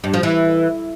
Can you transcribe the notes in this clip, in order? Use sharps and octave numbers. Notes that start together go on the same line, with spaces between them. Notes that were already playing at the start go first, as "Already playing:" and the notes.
G2
F3
E3